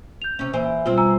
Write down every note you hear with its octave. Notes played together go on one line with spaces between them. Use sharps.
G6 F7
C3 C#4
A#2 E3 C5
B2 G3 C4 F4
G#5 A#5 E6